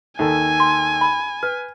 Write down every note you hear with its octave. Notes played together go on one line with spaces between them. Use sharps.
D#2 A4 G#5
C6
B5
B4 F6